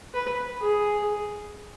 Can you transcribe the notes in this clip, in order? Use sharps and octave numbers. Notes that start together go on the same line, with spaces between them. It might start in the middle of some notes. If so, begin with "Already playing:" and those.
B4
G#4